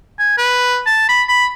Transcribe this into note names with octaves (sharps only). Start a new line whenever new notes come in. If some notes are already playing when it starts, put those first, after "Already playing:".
G#5
B4
A5
B5
B5